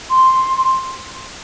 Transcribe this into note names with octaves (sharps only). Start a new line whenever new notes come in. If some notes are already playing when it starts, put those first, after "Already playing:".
C6